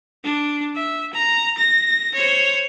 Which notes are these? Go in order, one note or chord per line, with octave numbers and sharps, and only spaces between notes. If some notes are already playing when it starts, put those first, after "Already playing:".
D4
E5
A#5
A#6
C5 C#5